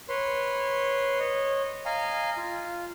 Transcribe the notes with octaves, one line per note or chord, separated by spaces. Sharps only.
B4 C#5 C6
C#5 D#5
D#5 F5 G#5 A#5
F4